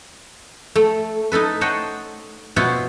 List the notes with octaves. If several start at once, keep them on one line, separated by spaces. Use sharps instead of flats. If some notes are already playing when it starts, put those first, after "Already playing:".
A3
D#4 E4 A4 B4
C5 C#5 D#5 F#5 G5 A5
B2 E4 F4 C5 C#5 F#5